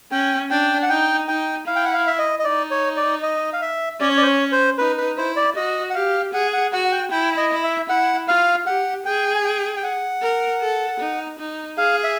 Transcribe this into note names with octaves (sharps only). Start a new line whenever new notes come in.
C#4 G5
D4 G5
F#5
D#4 G5
D#4 G5
E4 F5
G5
F#5
F5
E5
D#5
D#5
D#4 D5
C#5
D5
D#5
F5
E5
C#4 D5
C#5
D5
C5
C#5
C5
D#4 B4
B4
E4 C5
D5
F#4 D#5
F#5
G4 F5
G#4 F#5
F#5
F#4 F#5
F#5
G5
E4 G5
D#5
E4
E5
E4 F#5
F4 F5
G4 F#5
G#4 G5
G#5
G5
G5
F#5
A#4
A4
D#4
D#4
G#4 F5
E5